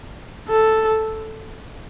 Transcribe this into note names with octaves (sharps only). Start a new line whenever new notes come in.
A4